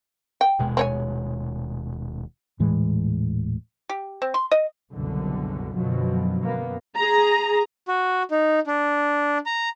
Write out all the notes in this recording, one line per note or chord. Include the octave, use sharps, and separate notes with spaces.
G5
D#1 B2 G#3
C4 C#5 G#5
D#1 A2 E3 G#3
G4
C4
C6
D#5
F#1 C2 F#2 B2 D3
F#2 B2 D3 F3 F#3
F#2 A#3 B3
G#4 A#5
F#4
D#4
D4
A#5